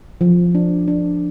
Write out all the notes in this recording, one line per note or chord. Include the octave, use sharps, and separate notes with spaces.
F3
D4
D4